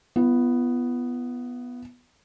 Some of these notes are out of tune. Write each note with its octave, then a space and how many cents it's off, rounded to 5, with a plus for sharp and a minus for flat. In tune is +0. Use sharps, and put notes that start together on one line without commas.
B3 +0 F4 -40